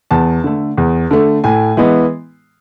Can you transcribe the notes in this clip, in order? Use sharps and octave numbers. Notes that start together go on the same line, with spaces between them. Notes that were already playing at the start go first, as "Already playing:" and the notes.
E2 A5
D3 A3
E2
D3 A3
A2 G#5
E3 G#3 B3